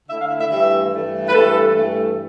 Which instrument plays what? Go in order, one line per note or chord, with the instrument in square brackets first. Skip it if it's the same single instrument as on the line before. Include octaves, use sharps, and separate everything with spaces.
[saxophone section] D3 A3 E4 E5
F5
E5
E5
G2 E3 A3 E5
G2 E3 A3
B4
G2 E3 A3 A4
G2 E3 A3